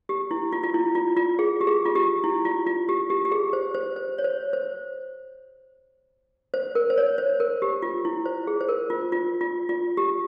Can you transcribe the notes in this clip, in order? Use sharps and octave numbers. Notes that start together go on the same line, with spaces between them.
G4
E4
F4
F4
E4
F4
F4
G#4
G4
G#4
F4
G4
E4
F4
F4
G4
G4
G4
G#4
C5
C5
C5
C#5
C5
C5
C5
A#4
C5
C#5
C5
A#4
G4
F4
E4
C5
G#4
C5
A#4
F4
F4
F4
F4
G4